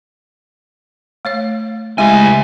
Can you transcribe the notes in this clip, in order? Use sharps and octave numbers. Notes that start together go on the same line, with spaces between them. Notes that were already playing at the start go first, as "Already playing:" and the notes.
A3 C#5 F5
C#2 G#3 A3 E4 G4 G#5